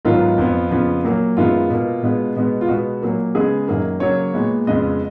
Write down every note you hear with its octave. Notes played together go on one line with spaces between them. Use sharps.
G#2 D#3 F#3 B3 F4
F2 F3 B3
F2 C#3 F3 B3
A#2 F#3 A#3
F#2 D#3 G#3 B3 F4
B2 A#3
B2 G#3 B3
B2 G#3 B3
F4
B2 G#3 B3 F#4
A#2 F#3 A#3
C#3 G#3 B3 G#4
F#2 D#3 F#3 A#3
C#3 F#3 A#3 C#5
A#2 G#3 B3
F2 C#3 G#3 B3 D#5